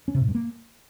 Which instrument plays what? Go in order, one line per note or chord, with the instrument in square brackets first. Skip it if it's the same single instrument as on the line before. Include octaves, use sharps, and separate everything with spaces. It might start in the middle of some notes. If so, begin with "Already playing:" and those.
[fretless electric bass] C#4
C3
A2
G2
A#3